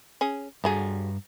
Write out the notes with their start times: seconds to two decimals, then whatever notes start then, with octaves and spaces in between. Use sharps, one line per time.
0.21 C#4 G#4
0.64 G2 D3 F#3 G#4 A#5